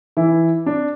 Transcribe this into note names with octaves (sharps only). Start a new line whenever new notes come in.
E3 E4
D4